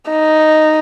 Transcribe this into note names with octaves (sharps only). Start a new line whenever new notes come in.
D#4